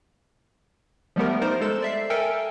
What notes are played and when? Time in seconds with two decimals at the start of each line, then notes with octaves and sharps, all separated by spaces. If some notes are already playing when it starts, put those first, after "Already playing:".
1.16 F3 G3 A3 B3 G4 A#4
1.42 D#4 A#4 C5 D5
1.61 G#3 A4 E7
1.82 D5 E5 C7
2.10 A4 A#4 E5 G5 G#5